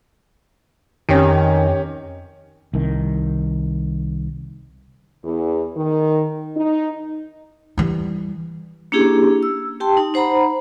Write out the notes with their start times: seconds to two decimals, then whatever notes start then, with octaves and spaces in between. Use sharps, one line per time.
1.09 F2 D#3 C#4 G4
2.74 C2 D#3
5.23 E2
5.77 D#3
6.56 D#4
7.78 E3 G3
8.92 A#3 C#4 D4 E4 G4 G#4
9.43 E6
9.80 G4 G5 A5 C6
9.97 D#4
10.14 D#4 C5 F#5 A#5 B5